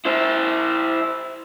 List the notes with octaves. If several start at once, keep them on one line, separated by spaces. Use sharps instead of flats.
E4 C5